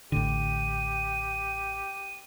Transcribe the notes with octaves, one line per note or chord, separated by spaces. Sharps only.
A1 A2 D3 G4 D#7